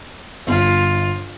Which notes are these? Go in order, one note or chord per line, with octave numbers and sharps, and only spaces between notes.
G1 F4